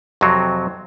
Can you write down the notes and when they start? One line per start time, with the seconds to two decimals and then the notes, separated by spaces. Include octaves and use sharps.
0.21 F2 C3 F#3 C4